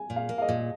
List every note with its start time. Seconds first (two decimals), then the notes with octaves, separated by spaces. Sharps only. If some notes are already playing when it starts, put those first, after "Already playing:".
Already playing: G#5
0.10 A#2
0.16 F5
0.29 A#3
0.38 F5
0.42 D#5
0.49 A#2